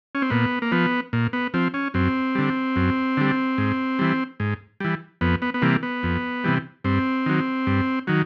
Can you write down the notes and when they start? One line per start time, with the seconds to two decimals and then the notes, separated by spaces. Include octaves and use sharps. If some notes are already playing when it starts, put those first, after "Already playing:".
0.15 C#4
0.22 C4
0.30 A#2 B3
0.62 A#3
0.72 F3 B3
1.13 A#2
1.33 B3
1.54 F3 C4
1.74 C#4
1.94 F#2 C4
2.35 D3 G3
2.76 F#2
3.17 D3 G3
3.58 G#2
3.99 E3 G3
4.40 G#2
4.80 E3 G3
5.21 F2 B3
5.42 B3
5.54 B3
5.62 C3 E3 G3 A#3
5.83 B3
6.03 F2
6.44 C3 E3 G3
6.84 G2 C4
7.26 D#3 F#3
7.67 G2
8.07 D#3 F#3